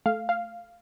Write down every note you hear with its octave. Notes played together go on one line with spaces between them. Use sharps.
A3 F5
F5